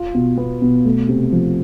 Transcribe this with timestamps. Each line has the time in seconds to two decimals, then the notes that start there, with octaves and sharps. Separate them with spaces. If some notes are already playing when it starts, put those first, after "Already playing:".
Already playing: F4
0.14 B2
0.37 B3
0.62 B2
0.85 A3
1.09 C3
1.32 F3